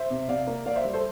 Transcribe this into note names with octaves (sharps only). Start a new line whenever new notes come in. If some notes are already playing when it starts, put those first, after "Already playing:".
Already playing: C5 E5
C3
C3 D5 F5
A#3
A#3 D5 F5
C5 E5
G3
A4 C5